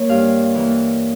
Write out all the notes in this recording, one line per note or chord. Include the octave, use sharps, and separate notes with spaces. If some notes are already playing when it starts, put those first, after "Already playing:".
Already playing: A#3 C#5
G2 F5
E3 A#3